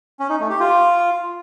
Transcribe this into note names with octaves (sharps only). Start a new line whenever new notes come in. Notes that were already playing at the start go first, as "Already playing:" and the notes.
C#4
D#4
A3
G4
F4